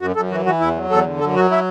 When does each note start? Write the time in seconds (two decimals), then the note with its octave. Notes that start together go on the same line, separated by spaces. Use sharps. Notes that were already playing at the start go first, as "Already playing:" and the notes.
0.01 F#2 F#4
0.16 F#2 A4
0.31 E3 F#4
0.46 E3 F#4
0.60 E2 E4
0.76 F#3
0.90 E2 A4
1.06 D3
1.20 F#2 A4
1.36 F#3 F#4
1.51 E4